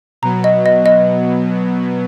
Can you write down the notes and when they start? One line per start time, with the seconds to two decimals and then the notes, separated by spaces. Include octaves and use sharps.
0.22 B2 F#3 B3 A#5
0.44 D#5
0.66 D#5
0.86 D#5